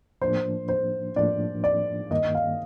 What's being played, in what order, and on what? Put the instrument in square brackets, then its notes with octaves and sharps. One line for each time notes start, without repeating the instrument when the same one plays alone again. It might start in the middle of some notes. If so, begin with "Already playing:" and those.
[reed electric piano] A2 F3 A#3 D4 [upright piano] C5
[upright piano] C5
[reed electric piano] A2 F3 A#3 D4 [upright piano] D5
[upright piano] D5
[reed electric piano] G2 D#3 A#3 [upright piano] D#5
[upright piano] F5